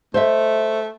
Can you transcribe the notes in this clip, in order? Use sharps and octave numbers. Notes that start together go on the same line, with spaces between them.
A3 C5 D#5 E5